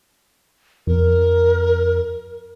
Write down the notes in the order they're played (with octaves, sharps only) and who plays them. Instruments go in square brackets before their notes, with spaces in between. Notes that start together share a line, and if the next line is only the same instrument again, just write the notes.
[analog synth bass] F2 [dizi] A#4